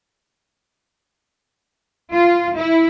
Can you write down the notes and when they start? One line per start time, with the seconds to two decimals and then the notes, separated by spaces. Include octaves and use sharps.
2.12 F4
2.56 E4